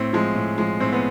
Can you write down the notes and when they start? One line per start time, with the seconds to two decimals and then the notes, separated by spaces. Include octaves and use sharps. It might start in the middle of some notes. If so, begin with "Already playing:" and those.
Already playing: A2 C4
0.13 F3 G#3
0.35 A2
0.58 F3 G#3
0.80 A2 C4
0.93 B3